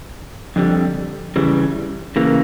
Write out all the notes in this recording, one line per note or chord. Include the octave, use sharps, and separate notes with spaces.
F2 D3 G3
C#3 E3 G3
C#3 E3 A#3